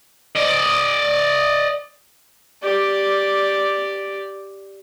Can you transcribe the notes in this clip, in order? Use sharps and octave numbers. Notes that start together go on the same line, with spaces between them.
D5 D#5
G4 D5